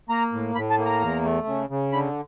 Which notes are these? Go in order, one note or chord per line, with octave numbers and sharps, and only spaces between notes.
A#3 A#5
A2
A2 B5
A5
A#3
A#5
E2
A3
C#3
C#3
D3 B5